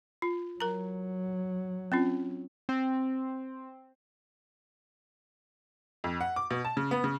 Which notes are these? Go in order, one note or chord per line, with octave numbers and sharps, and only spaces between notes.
F4
F#3 A#4 A#5
C4 C#4 F4
C4
F2
F#5
D6
B2
A5
C#3
B3
C#3